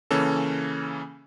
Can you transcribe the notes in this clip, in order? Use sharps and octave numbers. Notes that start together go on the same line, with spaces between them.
C#3 E3 A#3 C#4 A4